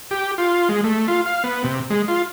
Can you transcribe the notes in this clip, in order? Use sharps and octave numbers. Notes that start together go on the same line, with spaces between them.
G4
F4
G#3
A3
F4
F5
B3
C3
G#3
F4